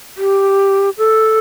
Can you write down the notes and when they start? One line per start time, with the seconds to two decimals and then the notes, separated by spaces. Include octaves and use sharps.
0.17 G4
0.98 A4